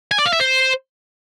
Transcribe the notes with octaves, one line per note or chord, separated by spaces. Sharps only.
G#5
D5
F5
E5
C5